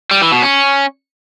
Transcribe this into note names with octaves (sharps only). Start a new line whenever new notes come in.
G3
E3
B2
C#4